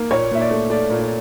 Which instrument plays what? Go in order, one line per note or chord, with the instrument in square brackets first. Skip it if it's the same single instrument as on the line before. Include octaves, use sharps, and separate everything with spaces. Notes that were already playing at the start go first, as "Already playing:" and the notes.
Already playing: [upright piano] A#3
A#2 C#5
A#2 E5
D5
A3
A3 D5
A#2